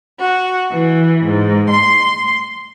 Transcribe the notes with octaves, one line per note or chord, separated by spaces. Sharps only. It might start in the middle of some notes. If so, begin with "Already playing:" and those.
F#4
E3
G#2
C6